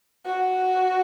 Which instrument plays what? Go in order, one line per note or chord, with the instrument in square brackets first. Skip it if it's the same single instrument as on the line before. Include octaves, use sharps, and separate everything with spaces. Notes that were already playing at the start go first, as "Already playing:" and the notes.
[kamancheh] F#4